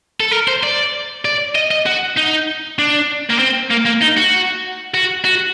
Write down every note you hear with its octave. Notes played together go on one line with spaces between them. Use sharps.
A4
A#4
C5
D5
D5
D#5
D#5
F#4
D#4
D4
A#3
C4
A#3
A#3
D#4
F#4
F#4
F#4